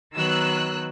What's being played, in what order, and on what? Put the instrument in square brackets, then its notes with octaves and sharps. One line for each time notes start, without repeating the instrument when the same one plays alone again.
[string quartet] D#3 F#3 B3 [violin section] E6 F#6